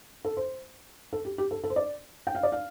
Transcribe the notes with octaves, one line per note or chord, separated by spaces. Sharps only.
A4
C5
A4
G4
G4
A4
A4
C5
D5
G5
F5
D5
F5